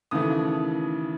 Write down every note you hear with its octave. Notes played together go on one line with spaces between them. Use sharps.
D#2 C#3 E3 A3 D#6